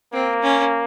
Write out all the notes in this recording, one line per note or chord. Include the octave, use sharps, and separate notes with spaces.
A#3 C4
C#4